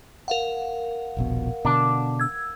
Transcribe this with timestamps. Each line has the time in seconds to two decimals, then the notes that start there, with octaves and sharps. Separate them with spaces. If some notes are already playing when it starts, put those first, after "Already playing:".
0.28 A#4 F5 F#5
1.17 D#1 A#1 B2
1.65 B2 D3 D4
2.20 E6 G#6